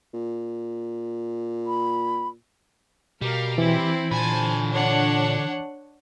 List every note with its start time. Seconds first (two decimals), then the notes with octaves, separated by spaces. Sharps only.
0.14 A#2
1.67 B5
3.22 B2 G3 A#4 F5
3.58 E3 C4 E4
4.11 A#2 D3 C5 G#5 A5 B5
4.74 D4 C#5 F#5